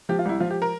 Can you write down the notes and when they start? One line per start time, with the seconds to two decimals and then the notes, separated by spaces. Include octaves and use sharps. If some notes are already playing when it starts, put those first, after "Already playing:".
0.09 F3 G4
0.19 F4
0.25 C2 E4
0.40 F3 F4
0.51 G4
0.62 A#4